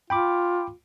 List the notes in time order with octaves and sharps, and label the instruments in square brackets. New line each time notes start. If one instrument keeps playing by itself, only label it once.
[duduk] F4 [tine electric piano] G5 B5 D6